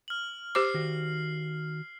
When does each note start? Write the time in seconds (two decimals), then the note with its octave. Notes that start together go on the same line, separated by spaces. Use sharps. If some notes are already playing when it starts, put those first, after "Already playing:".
0.08 F6 F#7
0.55 G4 C5 D6 C7
0.74 D#3 F#4